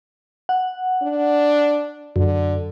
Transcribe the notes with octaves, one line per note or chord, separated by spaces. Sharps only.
F#5
D4
F#2 D3